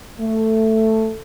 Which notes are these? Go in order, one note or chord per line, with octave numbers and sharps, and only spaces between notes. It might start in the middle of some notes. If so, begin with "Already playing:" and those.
A3